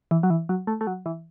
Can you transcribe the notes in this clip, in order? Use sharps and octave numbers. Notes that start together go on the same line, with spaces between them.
E3
F#3
E3
F#3
A3
A3
F#3
E3